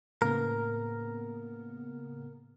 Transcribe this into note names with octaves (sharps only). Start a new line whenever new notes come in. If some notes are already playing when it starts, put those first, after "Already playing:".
A2 C#3 A#3 B3 A#4